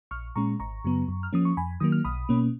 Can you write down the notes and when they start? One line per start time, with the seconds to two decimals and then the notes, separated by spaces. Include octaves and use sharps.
0.11 A#1 C#6 F6
0.36 A#2 G#3 C#4 A#5 C#6
0.60 G#1 A#5 C#6
0.85 F#2 C#3 F#3 B3
1.08 F#2
1.23 F6
1.33 F3 A#3 C#4 D#6
1.45 C#6
1.57 F2 G#5 B5
1.80 D#3 F#3 A#3 D#6
1.92 F6
2.05 B1 B5 D#6
2.29 B2 A#3 C#4